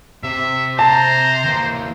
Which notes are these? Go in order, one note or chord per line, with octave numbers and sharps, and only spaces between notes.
C3 E5
C5 A5 A#5
E3 A#3